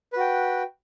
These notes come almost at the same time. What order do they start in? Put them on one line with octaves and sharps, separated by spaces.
B4 F#4 G5